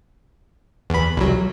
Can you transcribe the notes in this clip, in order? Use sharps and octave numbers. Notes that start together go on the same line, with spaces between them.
E2 B5
C2 F#3